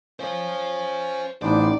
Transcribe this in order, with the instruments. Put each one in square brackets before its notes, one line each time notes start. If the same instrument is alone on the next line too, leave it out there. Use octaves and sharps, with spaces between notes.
[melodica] C#4 [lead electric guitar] C5 F5
[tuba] A1 [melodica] B3 D4 C5 [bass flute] D#4 [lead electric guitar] D5